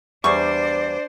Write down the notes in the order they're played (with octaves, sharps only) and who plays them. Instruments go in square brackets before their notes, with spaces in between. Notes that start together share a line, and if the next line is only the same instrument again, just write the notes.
[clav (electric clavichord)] E2 G3 [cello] D4 C5 [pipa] G#4 C#6 [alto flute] D5